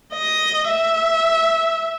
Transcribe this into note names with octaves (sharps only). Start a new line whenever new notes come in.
D#5
E5